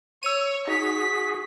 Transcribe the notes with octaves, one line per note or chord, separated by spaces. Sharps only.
C#5 E6 D#7
D#4 F#4 G#4 B6